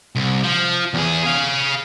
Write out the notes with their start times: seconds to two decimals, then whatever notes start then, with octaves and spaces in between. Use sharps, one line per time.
0.16 C2
0.43 F3
0.94 E2 G#4
1.23 G#4 F5